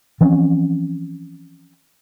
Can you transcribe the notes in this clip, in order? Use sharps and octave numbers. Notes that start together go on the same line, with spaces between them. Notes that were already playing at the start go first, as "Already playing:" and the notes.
E3 F3 C4 C#4